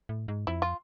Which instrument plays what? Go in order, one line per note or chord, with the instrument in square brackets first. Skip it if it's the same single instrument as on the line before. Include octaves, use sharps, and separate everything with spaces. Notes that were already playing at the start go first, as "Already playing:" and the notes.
[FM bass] A2
G#2
[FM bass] F2 [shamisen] E4
[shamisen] F4